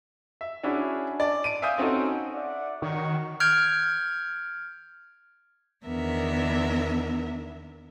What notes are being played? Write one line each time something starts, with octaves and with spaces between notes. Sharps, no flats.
E5
C#4 D4 E4 F#4 G#4
D5 A5
D7 D#7
E5 F5 G#5 D#6 G6
C4 C#4 D#4 F#4 A4
D5 E5 F#5
D#3 F#4 C#5 C#6
F6 G6 G#6 D7
E2 D#3 B3 D4 A#4 E5